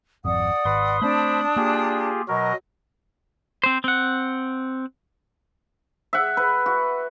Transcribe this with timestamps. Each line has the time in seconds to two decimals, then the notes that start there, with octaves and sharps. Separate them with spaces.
0.25 G#1 F2 D5 F#5 D#6
0.65 G#1 B4 C6
1.02 A3 C4 D4 C5 A5 B5
1.56 A#3 F4 G4 G#4
2.28 B2 F#3 A#4 D#5 C#6
3.64 C4 C5
3.84 C4 F#5
6.13 E5 F#5
6.37 B4
6.66 F#4